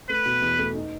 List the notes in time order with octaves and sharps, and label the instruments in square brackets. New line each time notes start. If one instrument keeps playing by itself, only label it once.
[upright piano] A3 [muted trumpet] B4
[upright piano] B2
E2
A3
D#4